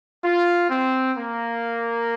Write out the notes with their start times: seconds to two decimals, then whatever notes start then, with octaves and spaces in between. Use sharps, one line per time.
0.24 F4
0.70 C4
1.18 A#3